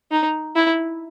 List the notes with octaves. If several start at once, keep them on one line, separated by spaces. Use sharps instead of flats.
D#4
E4